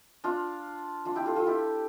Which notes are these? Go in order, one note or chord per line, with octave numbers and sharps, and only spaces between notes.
D4 F4
D4 F4
E4 G4
F4 A4
F4 A4
E4 G4